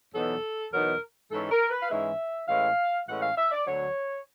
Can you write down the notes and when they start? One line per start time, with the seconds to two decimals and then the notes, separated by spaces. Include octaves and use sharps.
0.13 E2 B2 F#3 B3 D#4 A4
0.72 E2 B2 F#3 B3 D#4 A#4
1.31 G#2 E3 G#3 C#4 A4
1.51 A#4
1.70 B4
1.81 F5
1.90 G#2 E3 G#3 C#4 E5
2.48 A2 E3 G#3 C#4 F5
3.07 A2 E3 G#3 C#4 F#5
3.22 F5
3.36 E5
3.51 D5
3.66 D2 D3 F#3 C#5